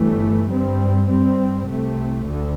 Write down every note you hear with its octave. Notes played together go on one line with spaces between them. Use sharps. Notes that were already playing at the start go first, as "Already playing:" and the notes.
Already playing: G1 G2 E3 A3
G2 G3 C4
G2 G3 C4
C2 C3 A3
D2 D3